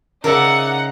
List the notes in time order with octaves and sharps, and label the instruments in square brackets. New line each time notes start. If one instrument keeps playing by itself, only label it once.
[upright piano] C#3 A#5 [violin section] D#4 F#5 [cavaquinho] A#4 D5 E5